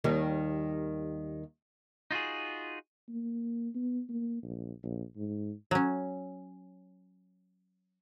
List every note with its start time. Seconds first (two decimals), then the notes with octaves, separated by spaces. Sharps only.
0.04 D#2 D#3 G3
2.11 D#4 F4 F#4 G#4
3.09 A#3
3.75 B3
4.09 A#3
4.43 A#1
4.84 A#1
5.16 G#2
5.71 F#3 C#4